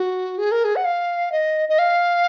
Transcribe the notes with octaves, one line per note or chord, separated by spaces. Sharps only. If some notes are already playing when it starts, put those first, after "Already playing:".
Already playing: F#4
G#4
A#4
G#4
F#5
F5
D#5
D#5
F5